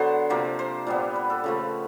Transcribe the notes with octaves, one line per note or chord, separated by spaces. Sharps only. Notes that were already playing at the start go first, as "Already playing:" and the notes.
Already playing: D3 F#3 B3 C5
C3 F3 A#3
C5
A#2 G3 B3
B4
A4
C#3 F3 A3